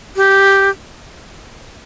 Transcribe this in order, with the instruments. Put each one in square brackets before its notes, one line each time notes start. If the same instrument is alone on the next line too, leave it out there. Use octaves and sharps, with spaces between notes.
[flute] G4